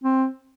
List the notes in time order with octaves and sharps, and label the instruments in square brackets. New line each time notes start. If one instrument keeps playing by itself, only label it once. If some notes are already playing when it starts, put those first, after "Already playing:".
[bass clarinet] C4